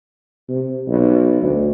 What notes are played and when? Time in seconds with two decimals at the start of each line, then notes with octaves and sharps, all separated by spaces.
0.49 C3
0.87 B1
1.42 D2